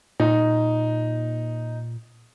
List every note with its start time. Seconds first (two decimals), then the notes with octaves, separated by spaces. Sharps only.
0.20 A#2 D#4